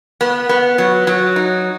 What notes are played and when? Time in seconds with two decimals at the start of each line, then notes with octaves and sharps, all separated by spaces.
0.21 B3
0.49 B3
0.78 F#3
1.07 F#3
1.36 D#4